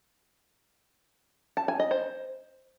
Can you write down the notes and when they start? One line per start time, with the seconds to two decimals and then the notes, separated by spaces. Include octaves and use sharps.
1.57 A5
1.68 G#5
1.80 D#5
1.91 C5